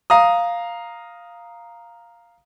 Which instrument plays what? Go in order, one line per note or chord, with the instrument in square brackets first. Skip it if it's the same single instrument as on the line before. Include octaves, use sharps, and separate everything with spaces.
[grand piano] F5 A#5 D#6